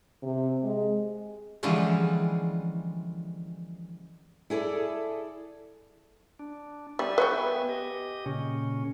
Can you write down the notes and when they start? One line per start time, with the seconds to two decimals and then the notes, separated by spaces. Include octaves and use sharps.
0.23 C3
0.63 G#3
1.63 D3 E3 F3 G3 G#3 C#4
4.50 E4 G#4 A4 D5
6.39 D4
6.99 G3 B3 E5 G#5
7.18 B4 C#5 G5
7.69 G4 D#5
8.26 A#2 C#3 C#4